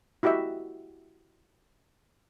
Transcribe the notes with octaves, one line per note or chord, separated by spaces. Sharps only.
E4 F#4 G4 D#5 E5